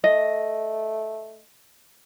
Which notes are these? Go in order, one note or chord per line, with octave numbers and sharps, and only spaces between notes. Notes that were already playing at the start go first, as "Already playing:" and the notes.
A3 D#5